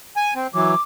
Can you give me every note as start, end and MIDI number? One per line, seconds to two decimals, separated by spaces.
0.17 0.34 80
0.35 0.47 60
0.54 0.75 52
0.54 0.75 54
0.54 0.81 86